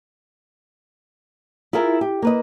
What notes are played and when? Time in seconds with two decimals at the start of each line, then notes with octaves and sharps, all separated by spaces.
1.73 E4 F4 G#4 A#4 E5
2.01 G4
2.22 A#3 B4 D#5